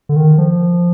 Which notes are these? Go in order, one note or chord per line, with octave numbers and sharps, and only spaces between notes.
D3
D#3
F3